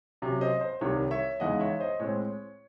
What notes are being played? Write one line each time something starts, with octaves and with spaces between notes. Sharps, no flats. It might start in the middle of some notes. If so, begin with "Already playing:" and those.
C3 F#3 C#4
C5 D#5
C5
C2 C3 D#3 C#5
C#5 E5
E2 C#3 G#3 D#4 D#5 F#5
C#5 E5
C5 D#5
A2 G#3 C4 C#5